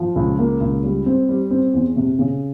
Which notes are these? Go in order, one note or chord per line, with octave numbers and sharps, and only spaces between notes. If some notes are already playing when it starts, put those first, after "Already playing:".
Already playing: F3
C#2
A#3
C#2
G3
C4
G3
C4
E2
C3
C#3